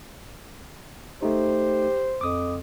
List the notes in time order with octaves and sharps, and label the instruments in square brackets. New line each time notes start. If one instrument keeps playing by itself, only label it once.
[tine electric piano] A3 D#4 [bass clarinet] G4 [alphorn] C5
[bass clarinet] F2 [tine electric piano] D6 D#6